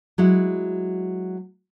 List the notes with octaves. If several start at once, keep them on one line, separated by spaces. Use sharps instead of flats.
F#3 G#3 E4